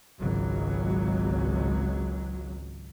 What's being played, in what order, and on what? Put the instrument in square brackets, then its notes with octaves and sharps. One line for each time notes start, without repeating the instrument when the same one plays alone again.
[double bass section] G#1 C#2 F#3